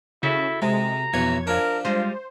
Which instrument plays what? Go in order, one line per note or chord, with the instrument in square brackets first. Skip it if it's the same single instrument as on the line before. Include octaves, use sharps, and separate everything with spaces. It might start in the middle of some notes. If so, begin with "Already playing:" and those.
[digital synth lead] C#3 [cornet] E4 [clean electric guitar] F#4 A4 E5
[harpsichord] C3 [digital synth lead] G#3 [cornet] A#5
[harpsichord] B1 E3 [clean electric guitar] F2 C#5 [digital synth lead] G#6
[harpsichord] F3 D4 [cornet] A#4
[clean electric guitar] G3 G#3 [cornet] F4 [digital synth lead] C5